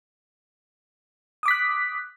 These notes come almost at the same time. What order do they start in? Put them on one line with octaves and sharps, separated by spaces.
D#6 D6 B6 F#6